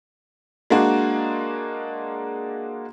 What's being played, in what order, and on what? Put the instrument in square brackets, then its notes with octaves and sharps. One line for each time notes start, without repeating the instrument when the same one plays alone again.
[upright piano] G#3 A#3 D4 F#4